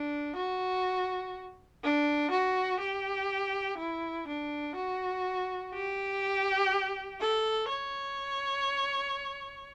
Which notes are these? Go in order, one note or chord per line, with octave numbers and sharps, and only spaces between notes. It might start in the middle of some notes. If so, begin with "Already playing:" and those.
Already playing: D4
F#4
D4
F#4
G4
E4
D4
F#4
G4
A4
C#5